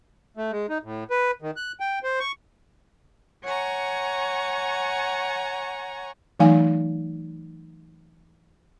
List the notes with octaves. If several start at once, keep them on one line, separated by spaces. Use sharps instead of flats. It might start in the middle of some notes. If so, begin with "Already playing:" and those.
A3
G#3
D#4
A2
B4
D#3
F#6
G5
C5
C#6
C#5 F#5 G#5 A#5 C#6
E3 F#3 A3 D#4 F5 G#5